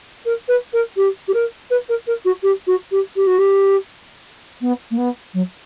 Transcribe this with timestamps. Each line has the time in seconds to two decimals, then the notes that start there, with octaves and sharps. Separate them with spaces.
0.25 A#4
0.48 B4
0.72 A#4
0.96 G4
1.28 G4
1.33 A#4
1.70 B4
1.88 A#4
2.07 A#4
2.25 F#4
2.43 G4
2.67 F#4
2.91 G4
3.16 G4
3.26 F#4
3.38 G4
4.61 B3
4.90 A#3
4.97 B3
5.33 F#3